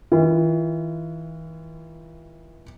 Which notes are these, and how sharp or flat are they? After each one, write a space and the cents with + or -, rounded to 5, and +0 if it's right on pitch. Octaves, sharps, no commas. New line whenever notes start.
E3 -40 F4 -40